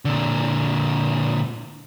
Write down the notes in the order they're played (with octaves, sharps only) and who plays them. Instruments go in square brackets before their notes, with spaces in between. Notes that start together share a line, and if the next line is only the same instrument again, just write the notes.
[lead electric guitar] A#2 D3